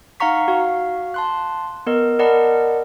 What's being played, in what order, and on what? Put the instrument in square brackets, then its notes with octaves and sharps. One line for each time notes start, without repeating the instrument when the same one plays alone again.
[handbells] D#4 F5 F#5 A#5 C#6 B6
F#4 F5
A5 C6 F#6
B3 A#4 D#5
A#4 D5 D#5 F#5 A5 B5